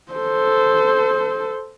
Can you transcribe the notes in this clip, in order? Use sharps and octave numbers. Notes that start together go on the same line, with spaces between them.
A4 C5